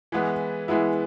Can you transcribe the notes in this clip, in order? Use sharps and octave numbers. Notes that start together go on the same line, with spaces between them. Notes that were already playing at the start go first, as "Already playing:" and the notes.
E3 G#3 B3 E4
E3 G#3 B3 E4